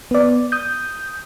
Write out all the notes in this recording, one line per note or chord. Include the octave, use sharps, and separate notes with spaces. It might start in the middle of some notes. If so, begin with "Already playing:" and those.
B3 D5
D#6 G6